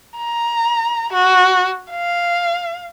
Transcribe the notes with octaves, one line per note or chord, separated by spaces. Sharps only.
A#5
F#4
F5